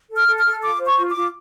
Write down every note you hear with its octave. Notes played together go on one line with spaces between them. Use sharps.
A4
F6
A4
F6
A4
F4 D6
C5
C#6
F4
D6
F4